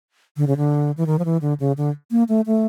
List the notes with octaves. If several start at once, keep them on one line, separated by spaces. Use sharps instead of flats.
D3
C#3
D3
E3
D#3
F3
E3
D3
C#3
D3
A#3
A3
A3